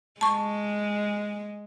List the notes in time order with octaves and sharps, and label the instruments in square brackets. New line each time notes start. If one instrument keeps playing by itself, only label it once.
[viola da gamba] G#3 [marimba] A5 C#6